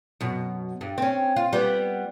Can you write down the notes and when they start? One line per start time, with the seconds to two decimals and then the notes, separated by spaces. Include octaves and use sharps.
0.21 F#2 B2
0.81 G2
0.98 C4 C#4
1.36 F4
1.53 G3 B3